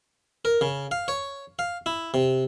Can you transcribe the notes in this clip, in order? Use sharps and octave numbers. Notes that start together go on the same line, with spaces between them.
A#4
C#3
F5
C#5
F5
E4
C3